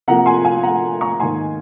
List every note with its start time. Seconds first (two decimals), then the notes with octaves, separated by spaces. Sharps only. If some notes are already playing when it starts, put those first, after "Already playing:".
0.08 C3 F3 A#3 F#5 A#5
0.26 G#5 C6
0.45 F5 G#5
0.63 F#5 A#5
1.01 A#5 C#6
1.20 G#2 D#3 A#3 G#5 C6